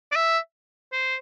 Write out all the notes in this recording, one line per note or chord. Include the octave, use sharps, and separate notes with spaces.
D5
E5
C5